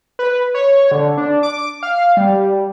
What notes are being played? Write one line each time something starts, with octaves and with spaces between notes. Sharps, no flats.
B4
C#5
D3
D4
D6
F5
G3